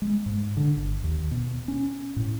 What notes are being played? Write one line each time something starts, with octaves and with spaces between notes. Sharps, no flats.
G#3
G#2
D3
G1
D#2
B2
C#4
A2